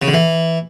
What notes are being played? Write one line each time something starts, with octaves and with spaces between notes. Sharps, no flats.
C#3
D3
E3